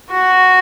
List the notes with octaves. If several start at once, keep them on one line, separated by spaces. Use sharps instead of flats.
F#4